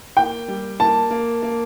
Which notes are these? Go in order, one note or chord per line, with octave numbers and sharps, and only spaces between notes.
A#3 G5
G3
A#3 A5
A#3
A#3